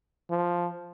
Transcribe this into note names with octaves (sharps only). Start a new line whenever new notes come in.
F3